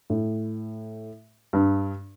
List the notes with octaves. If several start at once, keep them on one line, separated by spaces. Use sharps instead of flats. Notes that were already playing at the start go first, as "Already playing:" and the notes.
A2
G2